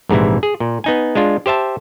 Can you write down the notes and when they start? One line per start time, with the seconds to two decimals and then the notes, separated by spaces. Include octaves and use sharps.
0.09 A#1 G#2 C3 E3 E4
0.43 G#4
0.60 A#2
0.84 B3 D#4 G#5
1.15 G#3 D4 F4
1.46 G4 C5 E5 A5